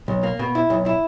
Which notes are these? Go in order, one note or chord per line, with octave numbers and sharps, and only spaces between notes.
B1
A#3
B2
E4
B1
E4